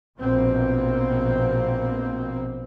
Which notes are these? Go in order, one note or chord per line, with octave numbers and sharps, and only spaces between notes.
A#1 B2 A#3 C4